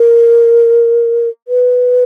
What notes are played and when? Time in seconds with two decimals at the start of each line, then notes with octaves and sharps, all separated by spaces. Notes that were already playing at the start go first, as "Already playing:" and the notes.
Already playing: A#4
1.48 B4